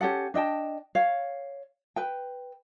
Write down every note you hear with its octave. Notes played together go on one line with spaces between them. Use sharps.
C#4 G4 A4 F#5
D4 D#5 G5 A5
C#5 F5
B4 G5